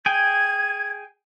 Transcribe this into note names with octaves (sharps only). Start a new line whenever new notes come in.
G#4 G5 G#5 G#6